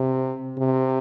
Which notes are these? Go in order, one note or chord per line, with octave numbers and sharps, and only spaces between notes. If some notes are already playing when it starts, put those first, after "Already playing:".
Already playing: C3
C3